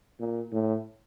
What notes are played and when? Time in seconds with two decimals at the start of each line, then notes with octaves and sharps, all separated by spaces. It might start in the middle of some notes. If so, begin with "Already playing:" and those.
0.20 A#2
0.52 A2